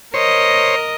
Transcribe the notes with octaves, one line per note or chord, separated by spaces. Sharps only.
A#4 C5 C#5 D#5